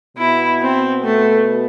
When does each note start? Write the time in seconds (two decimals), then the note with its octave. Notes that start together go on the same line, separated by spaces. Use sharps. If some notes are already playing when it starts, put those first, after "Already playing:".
0.17 B2 B3 E4
0.61 C4
1.04 A3